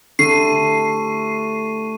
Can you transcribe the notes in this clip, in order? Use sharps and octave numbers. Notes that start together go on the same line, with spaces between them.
A2 D3 A3 G4 C#6 C7 D#7